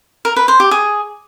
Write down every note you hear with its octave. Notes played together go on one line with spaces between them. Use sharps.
A#4
B4
C5
G4
G#4